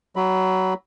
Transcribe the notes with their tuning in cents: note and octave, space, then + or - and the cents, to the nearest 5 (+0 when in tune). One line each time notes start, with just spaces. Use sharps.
F#3 +20 B5 +5